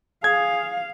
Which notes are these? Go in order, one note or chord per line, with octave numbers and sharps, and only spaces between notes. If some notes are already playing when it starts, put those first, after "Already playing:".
G#4 F5 G#6